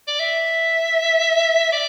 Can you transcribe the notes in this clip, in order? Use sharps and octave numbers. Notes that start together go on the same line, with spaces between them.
D5
E5
D5